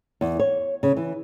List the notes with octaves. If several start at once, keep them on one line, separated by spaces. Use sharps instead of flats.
E2
C#5
C#3
E3